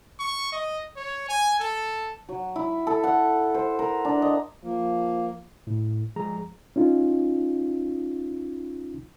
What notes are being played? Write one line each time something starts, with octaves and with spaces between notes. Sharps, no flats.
C#6
D#5
C#5
G#5
A4
F#3
E4
A4
F#5
C5
A#4
D4
D#5
F3 A#3
A2
F3 G#3 G#4 A#5
C#4 D#4 F4